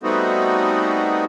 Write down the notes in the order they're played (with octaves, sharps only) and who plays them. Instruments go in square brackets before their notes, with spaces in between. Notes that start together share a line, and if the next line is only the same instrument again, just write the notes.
[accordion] G3 A3 B3 C4 D#4 F#4